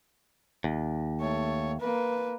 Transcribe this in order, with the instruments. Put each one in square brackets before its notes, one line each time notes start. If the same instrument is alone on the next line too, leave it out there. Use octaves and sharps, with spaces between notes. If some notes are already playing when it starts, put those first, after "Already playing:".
[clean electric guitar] D#2
[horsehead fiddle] A3 C#5
A#3 B4